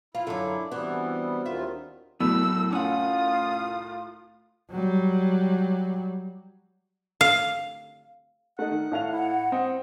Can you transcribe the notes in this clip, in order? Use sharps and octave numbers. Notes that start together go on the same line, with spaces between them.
E4 F4 B5
F#2 D3 D4 C6 D6
E3 G3 B3 C4 F#4
D#2 D#3 F4 E5
C2 A2 F#3 B3 E6
C#4 F4 F#5 D#6
F#3 G3
F5
A3 D#4 F#5
D#3
A2 F5 F7
E4 F#5
C4 D#5